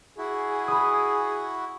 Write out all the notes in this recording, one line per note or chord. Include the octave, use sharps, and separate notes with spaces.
E4 F#4 G#4
B5 D#6